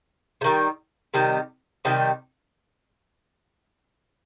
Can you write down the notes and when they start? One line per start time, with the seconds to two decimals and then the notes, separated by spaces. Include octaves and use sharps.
0.41 C3
0.44 D#3 G3
1.14 C3 D#3 G3
1.85 C3 D#3 G3